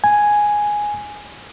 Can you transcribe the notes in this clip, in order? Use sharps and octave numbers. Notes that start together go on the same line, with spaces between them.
G#5